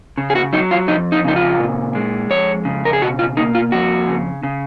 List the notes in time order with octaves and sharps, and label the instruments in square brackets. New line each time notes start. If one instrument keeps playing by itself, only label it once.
[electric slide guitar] C#3
G#4
F#4
F#3 D#4
F4
F2 D#4
D#4
C#3 D#4
F4
A#2
G#3
F2 C#5
C#3
A#4
G#4
B2 F#4
F4
A#3 D#4
F4
F2 F#4
C#3
C#3